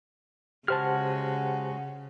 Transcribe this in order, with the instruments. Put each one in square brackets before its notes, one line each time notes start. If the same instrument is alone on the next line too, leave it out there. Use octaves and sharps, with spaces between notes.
[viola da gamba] C#3 [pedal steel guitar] G#3 F#4 F6 [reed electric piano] G4 C5 A5 [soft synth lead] F#5